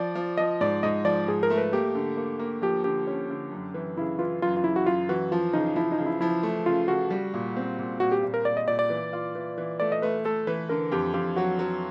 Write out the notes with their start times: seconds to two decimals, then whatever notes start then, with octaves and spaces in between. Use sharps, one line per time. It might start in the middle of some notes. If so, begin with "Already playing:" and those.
Already playing: F3 D5
0.15 F3
0.37 F3 D#5
0.61 G#2 D5
0.83 G#2 D#5
1.05 F3 D5
1.28 G#2 G#4
1.43 A#4
1.50 A3
1.57 B4
1.73 A#3 G4
1.95 D3
2.17 A#3
2.39 A#3
2.62 F3 G4
2.84 D3 G4
3.07 C#4
3.30 D3
3.52 F#2
3.74 E3
3.97 C#3 E4
4.19 E3 F4
4.42 F#2 F4
4.57 F4
4.64 C#3 E4
4.76 F#4
4.86 F#2 F4
5.09 E3 F#4
5.32 F3 F4
5.53 C#3 D#4
5.76 F3 E4
5.92 D#4
5.98 C#3
6.06 E4
6.21 F3 E4
6.43 A3
6.66 C#3 F4
6.88 C#3 F#4
7.10 G3
7.34 A#2
7.56 C4
7.79 A#2
8.00 A#2 F#4
8.12 G4
8.23 A#2
8.34 A#4
8.45 A#2 D5
8.57 D#5
8.67 A#2 D5
8.79 D5
8.90 E3
9.13 F4
9.35 E3
9.58 E3
9.80 A3 D5
9.92 D#5
10.02 A3 B4
10.25 A3 A4
10.47 E3 B4
10.69 D3 A#4
10.92 F2 G4
11.14 F2 G4
11.36 F#3 F#4
11.59 F#3